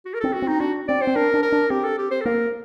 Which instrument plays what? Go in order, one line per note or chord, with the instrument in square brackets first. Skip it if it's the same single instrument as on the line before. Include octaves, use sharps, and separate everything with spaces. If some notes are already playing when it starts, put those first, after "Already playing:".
[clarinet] F#4
A#4
[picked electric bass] C4 [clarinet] A4
[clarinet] F#4
[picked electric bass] C4
[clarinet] D#4
[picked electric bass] D4 [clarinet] F#4
[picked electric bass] C4 [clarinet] D5
[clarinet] C5
[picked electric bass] C4
[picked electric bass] D4 [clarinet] A#4
[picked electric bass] D4
[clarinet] A#4
[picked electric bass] D4
[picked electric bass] C4 [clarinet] G4
[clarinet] A4
G4
C5
A4
[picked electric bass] A#3 [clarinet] A#4